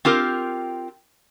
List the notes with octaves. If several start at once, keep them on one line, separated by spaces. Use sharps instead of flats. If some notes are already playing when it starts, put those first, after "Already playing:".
C4 F4 G4 A#4